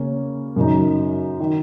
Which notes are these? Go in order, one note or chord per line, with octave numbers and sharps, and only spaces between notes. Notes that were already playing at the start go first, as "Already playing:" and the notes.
Already playing: C#3 A#3 C#4
F#2 C#3 F#3 D#4
D#3